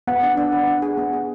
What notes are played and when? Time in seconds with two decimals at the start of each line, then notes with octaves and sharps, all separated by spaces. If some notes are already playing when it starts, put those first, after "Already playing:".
0.07 B3 F#5
0.23 D4
0.37 D4
0.52 B4
0.68 D4
0.82 G#4
0.97 B3
1.13 G#4